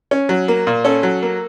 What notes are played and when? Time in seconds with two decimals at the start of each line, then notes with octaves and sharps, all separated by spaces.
0.11 C#4
0.29 F#3
0.48 A#3
0.67 A#2
0.85 C#4 A4
1.03 F#3
1.22 A#3